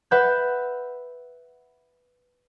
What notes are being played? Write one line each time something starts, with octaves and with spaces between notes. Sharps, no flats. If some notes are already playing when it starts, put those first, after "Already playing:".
B4 E5 F#5 E6 F#6 G6